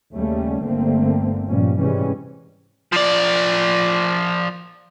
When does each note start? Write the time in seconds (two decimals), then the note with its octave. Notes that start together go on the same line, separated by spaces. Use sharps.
0.13 D#2 C#3 G3 A3 C#4
0.65 G1 D3 A3 A#3 C4
1.48 G2 A#2 F3 G3 C#4
1.77 G#2 C3 E3 G3 G#3 C#4
2.92 F3 D5